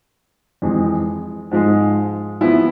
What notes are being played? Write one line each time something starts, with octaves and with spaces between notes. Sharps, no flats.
F2 E3 G#3
G#2 F3 G#3
F3 B3 E4